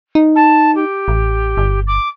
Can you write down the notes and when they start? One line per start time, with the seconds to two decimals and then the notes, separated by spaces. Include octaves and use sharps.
0.15 D#4
0.35 A5
0.75 G4
1.08 A1
1.57 G1
1.87 D6